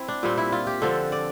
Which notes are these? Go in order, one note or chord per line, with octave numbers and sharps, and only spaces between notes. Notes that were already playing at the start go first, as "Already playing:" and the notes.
Already playing: C4 E4
D4
A#2 G3 C4
E4
F4
G4
D3 F3 C4 A4
D5